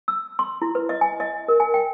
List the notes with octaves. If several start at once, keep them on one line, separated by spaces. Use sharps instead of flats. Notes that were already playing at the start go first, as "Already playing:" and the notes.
E6
C6
E4
B4
D#5
G#5
D#5
A#4
G#5
G5